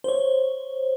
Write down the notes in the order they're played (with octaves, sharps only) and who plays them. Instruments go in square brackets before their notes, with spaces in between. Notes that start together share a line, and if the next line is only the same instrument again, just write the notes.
[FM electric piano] C5 C#5